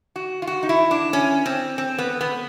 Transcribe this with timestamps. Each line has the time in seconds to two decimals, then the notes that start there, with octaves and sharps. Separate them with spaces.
0.16 F#4
0.42 F4
0.47 F#4
0.63 D#4
0.69 E4
0.91 D4
1.13 C#4
1.46 C4
1.78 C4
1.98 B3
2.21 B3